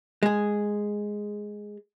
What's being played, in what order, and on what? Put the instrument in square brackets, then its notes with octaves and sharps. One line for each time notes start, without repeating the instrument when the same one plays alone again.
[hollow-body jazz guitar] G#3 G#4